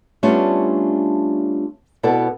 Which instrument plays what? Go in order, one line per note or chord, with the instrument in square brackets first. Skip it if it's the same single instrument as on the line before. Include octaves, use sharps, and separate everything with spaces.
[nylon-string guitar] G3 A3 B3 C#4 D4 F4
B2 B3 E4 F#4 A4 D5